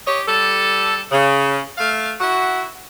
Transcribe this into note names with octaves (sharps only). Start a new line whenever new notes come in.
G4 C#5 D#5
G3 A4
C#3
A3 F5
E4 F#4